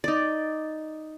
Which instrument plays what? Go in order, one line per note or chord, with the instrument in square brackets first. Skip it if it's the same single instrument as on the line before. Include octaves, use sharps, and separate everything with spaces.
[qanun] D#4 D5